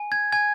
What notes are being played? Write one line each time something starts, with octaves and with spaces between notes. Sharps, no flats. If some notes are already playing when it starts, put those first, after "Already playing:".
Already playing: G#5
G#6
G#5 G#6